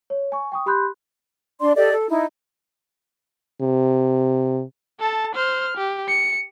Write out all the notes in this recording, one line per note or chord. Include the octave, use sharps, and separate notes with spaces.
C#5
G#5 C#6
G5 C#6 D#6
G4 B5 C6 F#6 G6
D4 D5 C6
G4 A4 D5 D#5
A4
D#4 E4
C3
A4 A5
C5 F6
G4
C#7